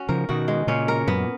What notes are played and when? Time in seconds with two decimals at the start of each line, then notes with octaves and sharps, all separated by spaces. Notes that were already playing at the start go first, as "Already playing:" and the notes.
Already playing: C#4 F#4
0.09 C#3 F3 A#4
0.29 B2 D#3 F#4
0.48 G#3
0.67 A#2 C#3 C#4
0.88 A#4
1.07 F#2 A#2 B3